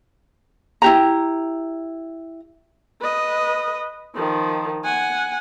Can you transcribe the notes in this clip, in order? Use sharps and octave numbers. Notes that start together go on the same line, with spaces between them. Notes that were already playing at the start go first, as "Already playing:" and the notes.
E4 G4 A#5
B4 D#5
D#3 F3
F#5 G#5